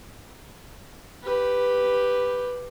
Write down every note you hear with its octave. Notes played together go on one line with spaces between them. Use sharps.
G4 B4